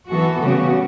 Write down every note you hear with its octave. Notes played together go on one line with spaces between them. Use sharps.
E3 B3 F#4 A4
C#3 G3 B3 F#4